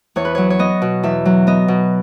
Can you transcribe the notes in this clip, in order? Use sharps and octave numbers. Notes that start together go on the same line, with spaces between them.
E2 C#5
B4
F#3 C#5
C#5
B3 D#5
B2
E2 E5
F#3
B3 D#5
B2